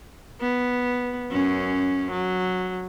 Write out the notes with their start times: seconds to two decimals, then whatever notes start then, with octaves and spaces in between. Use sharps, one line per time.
0.41 B3
1.31 F#2 C#4
2.11 F#3